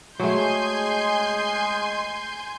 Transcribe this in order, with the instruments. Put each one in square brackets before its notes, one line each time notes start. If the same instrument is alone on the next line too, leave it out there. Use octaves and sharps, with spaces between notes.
[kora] F#3 A3 [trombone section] G#3 [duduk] G#4 [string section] G#5 C6 G6